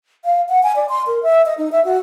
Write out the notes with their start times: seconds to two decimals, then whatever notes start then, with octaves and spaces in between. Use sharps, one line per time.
0.25 F5
0.49 F#5
0.63 G#5
0.76 D5
0.89 C6
1.07 A#4
1.23 E5
1.46 D#5
1.58 D#4
1.72 E5
1.85 F#4